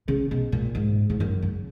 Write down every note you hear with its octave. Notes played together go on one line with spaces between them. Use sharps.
C#3
B2
A#2
G#2
G#2
F#2
C#3